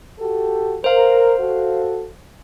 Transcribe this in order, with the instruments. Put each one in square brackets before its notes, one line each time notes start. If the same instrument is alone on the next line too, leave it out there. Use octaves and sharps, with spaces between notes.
[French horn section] F#4 G4 A4
[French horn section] A#4 [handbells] C5 F5
[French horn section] F#4 A4